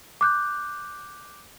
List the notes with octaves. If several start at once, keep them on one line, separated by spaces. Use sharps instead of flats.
D6 F#6 G6